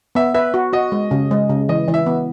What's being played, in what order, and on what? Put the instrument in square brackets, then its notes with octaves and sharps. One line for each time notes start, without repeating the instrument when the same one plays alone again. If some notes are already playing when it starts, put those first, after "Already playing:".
[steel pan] B3 [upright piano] E5
[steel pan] B4 [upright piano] E5
[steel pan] F#4
[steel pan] F#4 [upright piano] D#5
[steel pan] G#3
C#3
G#3
C#3
[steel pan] E3 [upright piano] D#5
[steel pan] E3
[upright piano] E5
[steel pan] B3